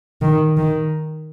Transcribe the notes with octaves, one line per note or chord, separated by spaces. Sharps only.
D#3
D#3